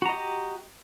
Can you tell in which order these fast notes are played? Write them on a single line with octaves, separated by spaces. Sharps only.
F#4 A#5 D#5 G4